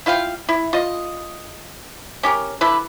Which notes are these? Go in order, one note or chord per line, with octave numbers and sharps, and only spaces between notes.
E4 F4 F5 G5
E4
F4 D#5
C#4 G4 A#4
D3 E4 A4 B4